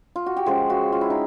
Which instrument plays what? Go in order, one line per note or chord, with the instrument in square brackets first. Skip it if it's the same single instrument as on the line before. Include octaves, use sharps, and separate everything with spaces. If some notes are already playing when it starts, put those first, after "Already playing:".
[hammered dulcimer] F4
F#4
G4
C#3 F3 G#3 G#4
F#4
F4
E4
D#4